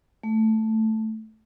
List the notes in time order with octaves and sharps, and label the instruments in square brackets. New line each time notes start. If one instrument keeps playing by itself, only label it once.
[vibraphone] A3